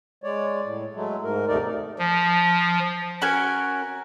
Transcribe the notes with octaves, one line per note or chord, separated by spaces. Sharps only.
G#3 C#5 D5
A2
F#3 G#3 A3
G#2 A#4
D#2 C3 A3 D#4 A#4 D5
F3
C#4 F#4 A#4 G#5